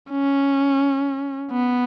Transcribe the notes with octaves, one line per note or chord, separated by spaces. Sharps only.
C#4
B3